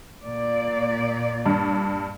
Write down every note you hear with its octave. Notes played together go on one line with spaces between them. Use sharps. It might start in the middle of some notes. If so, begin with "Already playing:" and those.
A#2 D5
G2